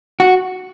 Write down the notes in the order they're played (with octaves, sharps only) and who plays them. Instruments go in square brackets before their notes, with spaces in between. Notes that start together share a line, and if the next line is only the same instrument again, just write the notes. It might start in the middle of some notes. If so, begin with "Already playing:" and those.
[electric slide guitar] F#4